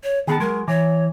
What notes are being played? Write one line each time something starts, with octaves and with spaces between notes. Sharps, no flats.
C#5
D#3 B3 G#4 A5
F#3 G#3 A#4
E3 C#5